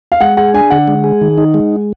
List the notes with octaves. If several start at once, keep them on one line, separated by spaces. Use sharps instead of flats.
F5
G#3 F#5
G#4 F#5
D4 G#5
D3 F#5
G#3
G#4
D#3
D#4
G#3